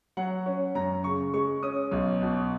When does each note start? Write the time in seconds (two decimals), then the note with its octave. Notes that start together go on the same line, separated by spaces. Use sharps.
0.17 F#3 F#5
0.46 C#4
0.75 F#2 A#5
1.04 C#3 C#6
1.34 G#3 C#6
1.63 C#4 D#6
1.91 B1
2.21 B2